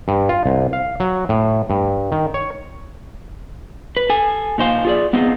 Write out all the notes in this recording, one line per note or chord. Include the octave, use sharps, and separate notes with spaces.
G2
F4
C2
F5
F#3
A2
G2
D#3
C#5
B4
A4 G#5
A#2 D#4 C5 F5
F4 G#4 D5
B3 C4 D#4 F4 G#4